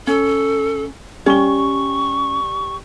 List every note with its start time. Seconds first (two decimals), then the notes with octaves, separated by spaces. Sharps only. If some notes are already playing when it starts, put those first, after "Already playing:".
0.07 C#4 A4
1.26 G3 C#4 C#6 G7